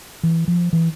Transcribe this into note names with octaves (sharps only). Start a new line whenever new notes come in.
E3
F3
E3